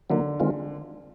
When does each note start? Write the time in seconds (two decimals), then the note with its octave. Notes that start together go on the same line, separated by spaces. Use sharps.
0.10 D3 D#3 F#3 A#3
0.40 D#3 G#3 C4 F4